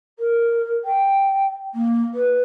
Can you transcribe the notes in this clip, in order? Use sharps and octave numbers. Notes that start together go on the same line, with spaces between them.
A#4
G5
A#3
B4